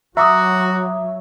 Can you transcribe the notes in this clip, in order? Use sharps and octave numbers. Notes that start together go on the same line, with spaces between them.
F#3 F#4 E5 A#5 D6 D#6